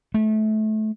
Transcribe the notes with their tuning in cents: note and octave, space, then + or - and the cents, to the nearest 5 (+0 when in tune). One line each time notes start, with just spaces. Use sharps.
A3 -25